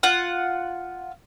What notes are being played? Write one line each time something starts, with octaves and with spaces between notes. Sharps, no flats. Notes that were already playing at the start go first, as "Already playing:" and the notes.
F4 F#5